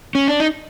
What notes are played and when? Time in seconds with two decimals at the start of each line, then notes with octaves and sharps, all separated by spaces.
0.15 C#4
0.28 D4
0.40 D#4